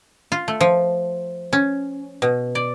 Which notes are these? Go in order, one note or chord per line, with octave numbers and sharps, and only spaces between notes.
F4
A3
F3
C#4
B2
D5